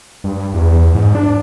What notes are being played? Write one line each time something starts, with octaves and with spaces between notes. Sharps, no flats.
G2
E2
G#2
D4